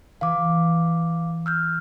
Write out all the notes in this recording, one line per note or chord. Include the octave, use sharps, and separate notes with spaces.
E3 F5 D6
E6 F6 G6